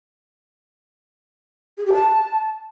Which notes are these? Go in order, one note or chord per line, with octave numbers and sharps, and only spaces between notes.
G#4
G4
A5